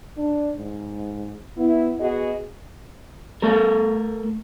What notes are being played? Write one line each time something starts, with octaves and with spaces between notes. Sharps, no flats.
D4
G#2
B3 E4
B3 F#4 G#4 D#5
A3 A4 A#4